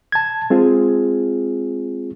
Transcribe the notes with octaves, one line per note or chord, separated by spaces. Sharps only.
A5 G#6
G#3 C4 F4 G#4